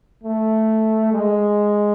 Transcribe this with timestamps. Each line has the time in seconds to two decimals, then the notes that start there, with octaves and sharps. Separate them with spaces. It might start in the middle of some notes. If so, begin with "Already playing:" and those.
0.23 A3
1.12 G#3